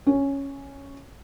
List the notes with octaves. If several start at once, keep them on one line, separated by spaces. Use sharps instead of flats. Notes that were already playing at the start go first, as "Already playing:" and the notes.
C#4